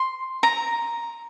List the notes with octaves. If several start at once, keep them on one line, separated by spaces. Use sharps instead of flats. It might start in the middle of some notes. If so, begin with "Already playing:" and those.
Already playing: C6
A#5